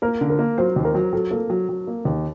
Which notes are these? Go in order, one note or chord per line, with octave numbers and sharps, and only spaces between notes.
A#3 A#4
D3
A#4
A#3
F#3 C5
D#2
A#4
F#3
F#3 A4
A#3 A4
F#3
F#3
A#3
D#2